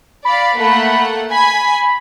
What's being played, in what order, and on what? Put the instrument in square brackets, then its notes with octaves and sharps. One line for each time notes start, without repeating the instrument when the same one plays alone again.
[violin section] D5 F5 [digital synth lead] B5
[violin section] A3 A#3 F#5
[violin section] G#5 G#6 B6 [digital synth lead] B5